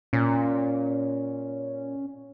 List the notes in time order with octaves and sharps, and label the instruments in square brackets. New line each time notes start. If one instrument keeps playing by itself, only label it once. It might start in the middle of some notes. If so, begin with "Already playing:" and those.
[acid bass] A#2 [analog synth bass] C#4